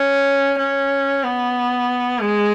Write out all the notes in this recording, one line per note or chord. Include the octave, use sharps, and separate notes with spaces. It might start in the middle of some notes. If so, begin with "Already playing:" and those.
Already playing: C#4
C#4
B3
G#3